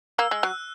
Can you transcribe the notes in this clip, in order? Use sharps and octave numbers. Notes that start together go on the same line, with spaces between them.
A#3 E6
G#3
F#3 F#6